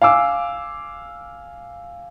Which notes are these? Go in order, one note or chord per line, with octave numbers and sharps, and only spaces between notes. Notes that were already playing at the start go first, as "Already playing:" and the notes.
F5 G#5 D6 E6